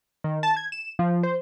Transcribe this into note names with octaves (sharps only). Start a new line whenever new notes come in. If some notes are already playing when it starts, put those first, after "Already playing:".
D#3
A5
G#6
E7
F3
C5